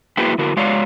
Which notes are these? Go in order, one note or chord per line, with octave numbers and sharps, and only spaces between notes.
A#3 E4 F#4 G#4 B4 G5
D3 E4 F#4 A#4
G#3 F#4 C#5 D5 F5